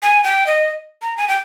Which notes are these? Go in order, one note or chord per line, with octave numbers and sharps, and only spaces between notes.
G#5
G5
D#5
A#5
G#5
G5